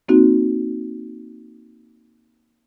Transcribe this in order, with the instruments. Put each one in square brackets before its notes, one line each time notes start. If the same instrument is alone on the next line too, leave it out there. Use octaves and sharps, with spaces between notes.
[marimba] A#3 C4 D#4 F#4